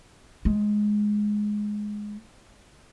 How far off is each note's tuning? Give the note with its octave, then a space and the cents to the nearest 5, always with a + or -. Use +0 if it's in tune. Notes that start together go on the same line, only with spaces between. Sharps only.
G#3 +5